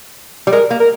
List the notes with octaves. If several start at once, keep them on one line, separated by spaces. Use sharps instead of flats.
G3
G#3 A#4
A#3
A#4